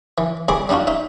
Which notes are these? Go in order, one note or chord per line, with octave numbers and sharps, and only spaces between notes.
E3
C2 G#4 B5 D6
G3 D4 D#4 F4 F#4
D#4 E5